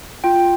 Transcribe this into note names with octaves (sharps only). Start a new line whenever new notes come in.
F4 G5